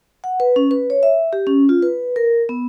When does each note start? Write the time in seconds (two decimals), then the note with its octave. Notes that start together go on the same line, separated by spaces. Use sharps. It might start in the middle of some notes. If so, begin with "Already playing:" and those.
0.24 F#5
0.40 B4
0.56 C#4
0.71 B4
0.90 C#5
1.03 E5
1.33 G4
1.47 C#4
1.69 F4
1.82 B4
2.16 A#4
2.49 B3